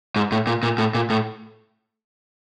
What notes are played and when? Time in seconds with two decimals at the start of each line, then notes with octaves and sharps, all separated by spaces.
0.16 G#2
0.32 A2
0.47 A#2
0.63 A#2
0.78 A2
0.95 A#2
1.10 A2